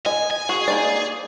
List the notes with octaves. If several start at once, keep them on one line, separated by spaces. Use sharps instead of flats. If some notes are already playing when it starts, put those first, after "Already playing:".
D#5 G#5
G#5
F#4 G#4
A#3 D#4 D5